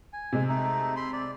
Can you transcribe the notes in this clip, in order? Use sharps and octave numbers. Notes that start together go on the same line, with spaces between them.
G#5
C3 G#3
A3 D#4
B5 C6
D5